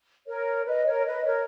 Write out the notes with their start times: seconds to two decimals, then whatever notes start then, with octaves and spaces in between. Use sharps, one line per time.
0.26 A#4 C#5
0.66 B4 D#5
0.86 A#4 C#5
1.05 B4 D#5
1.25 A#4 C#5